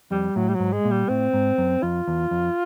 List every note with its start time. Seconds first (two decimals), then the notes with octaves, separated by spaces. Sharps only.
0.11 F2 G3
0.36 A2 F#3
0.49 G3
0.55 F#3
0.60 G#2
0.72 G#3
0.85 A#2
0.91 G3
1.09 A2 C4
1.33 G#2
1.58 F#2
1.83 F2 F4
2.08 E2
2.31 F2